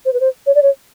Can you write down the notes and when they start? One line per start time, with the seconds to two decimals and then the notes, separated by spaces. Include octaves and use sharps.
0.05 C5
0.13 B4
0.20 C5
0.46 C#5
0.55 D5
0.62 C#5